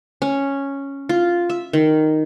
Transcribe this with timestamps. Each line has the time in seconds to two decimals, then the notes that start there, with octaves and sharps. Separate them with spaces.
0.22 C#4
1.09 F4
1.50 E5
1.73 D#3